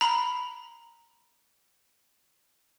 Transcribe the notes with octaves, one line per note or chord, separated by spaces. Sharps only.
A#5 B5